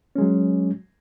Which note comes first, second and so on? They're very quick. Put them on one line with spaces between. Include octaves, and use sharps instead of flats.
C#4 G#3 F#3